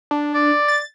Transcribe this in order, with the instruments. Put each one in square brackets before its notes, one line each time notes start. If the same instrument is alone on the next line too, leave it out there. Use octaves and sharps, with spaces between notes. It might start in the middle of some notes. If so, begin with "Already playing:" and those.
[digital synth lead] D4
[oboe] D5
[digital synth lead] A6